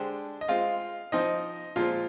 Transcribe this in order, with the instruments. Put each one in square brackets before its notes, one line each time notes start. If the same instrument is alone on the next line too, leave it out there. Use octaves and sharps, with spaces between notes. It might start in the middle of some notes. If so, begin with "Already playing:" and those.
Already playing: [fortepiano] D3 G#3 D4 G4 C5 [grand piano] G5
[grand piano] D#5
[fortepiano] G#3 C4 F4 [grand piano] F5
[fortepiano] F3 C4 D#4 [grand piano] D#5
[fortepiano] A#2 F3 G#3 C4 [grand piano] F4